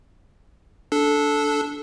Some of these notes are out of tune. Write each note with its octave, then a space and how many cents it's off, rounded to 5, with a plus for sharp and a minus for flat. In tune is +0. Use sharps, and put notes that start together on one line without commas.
D4 -10 A4 -10